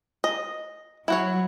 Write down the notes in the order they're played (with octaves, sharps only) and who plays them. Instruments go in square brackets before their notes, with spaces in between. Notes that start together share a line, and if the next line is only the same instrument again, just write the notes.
[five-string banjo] D#5
[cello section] F#3 [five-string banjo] E4 F#4 C#5